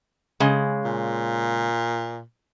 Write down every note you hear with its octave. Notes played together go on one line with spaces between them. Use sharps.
C#3 G#3
A#2